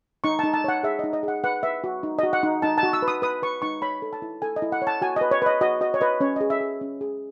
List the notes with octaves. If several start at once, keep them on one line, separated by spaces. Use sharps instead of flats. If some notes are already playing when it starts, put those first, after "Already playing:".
D#4 C#6
D#4 A5
A5
C#5 F#5
G#4 E5
D#4 D#5
D#5
G#4 F#5
B4 F#5
B4 E5
F#4
D#4
F#4 D#5
F#5
D#4
D#4 A5
A5
F#4
E6
B4
D#6
B4 D#6
B4 C#6
D#4 C#6
C#5 B5
A4
A5
E4
A4 G#5
D#5
E4
F#5
C#5
A5
F#4 G#5
B4 D#5
C#5
B4 D#5
F#4 D#5
F#4 D#5
C#5
B4 D#5
C#4 C#5
G#4 D#5
E5
G#4
C#4
G#4